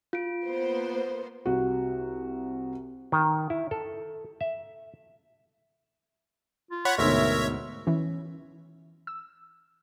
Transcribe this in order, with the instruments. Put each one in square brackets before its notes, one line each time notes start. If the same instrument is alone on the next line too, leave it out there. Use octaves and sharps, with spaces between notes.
[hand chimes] F4 D7
[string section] A#3 B3 C5
[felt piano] C2 F#4
[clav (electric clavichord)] D#3
E4
A4
E5
[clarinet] F4
[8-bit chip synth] C#5 F#5 B5
[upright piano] D2 G#2 B2 [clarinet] A#4 [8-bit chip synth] C#5 E5
[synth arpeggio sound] E3 C#4
E6